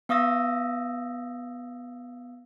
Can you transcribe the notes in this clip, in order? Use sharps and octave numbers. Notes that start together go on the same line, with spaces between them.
B3 F5 D#6 E6 A#6